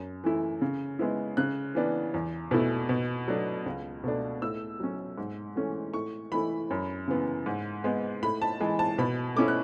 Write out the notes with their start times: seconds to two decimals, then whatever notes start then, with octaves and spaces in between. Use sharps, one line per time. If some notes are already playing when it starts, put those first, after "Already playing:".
Already playing: F#2
0.24 E3 A3 E4
0.62 C#3
0.99 G#3 B3 E4
1.37 C#3 F#6
1.75 E3 B3 D4
2.14 E2
2.51 B2 A3 E4
2.89 B2
3.28 F#3 A3 D4
3.66 C#2
4.04 B2 A3 D4
4.42 A2 E6
4.80 F#3 C#4
5.18 G#2
5.56 E3 A3 C#4
5.94 A2 C#6
6.32 E3 A3 E4 B5
6.70 F#2
7.08 C#3 E3 B3
7.46 G#2
7.84 G#3 B3
8.22 A2 B5
8.42 A5
8.60 E3 G#3
8.79 A5
8.98 B2 B5
9.36 A3 C#4 E4 D6
9.48 F#6